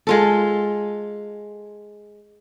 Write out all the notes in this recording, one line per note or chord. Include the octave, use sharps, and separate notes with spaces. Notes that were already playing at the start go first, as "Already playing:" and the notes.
G#3 F4 A4